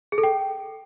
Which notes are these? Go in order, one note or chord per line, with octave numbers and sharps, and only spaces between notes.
G#4
A4
G5